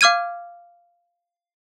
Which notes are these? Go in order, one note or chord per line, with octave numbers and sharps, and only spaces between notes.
F5 D6 F6 G#6 D#7